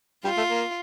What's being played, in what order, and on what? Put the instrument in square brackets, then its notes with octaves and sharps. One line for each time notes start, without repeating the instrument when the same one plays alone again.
[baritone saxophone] G3 [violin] F4
[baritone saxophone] A3
A#3